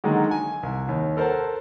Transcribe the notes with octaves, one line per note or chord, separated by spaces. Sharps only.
D3 D#3 F#3 G#3 A#3
G#5
C2
D#2
A4 A#4 C5 F#5 A5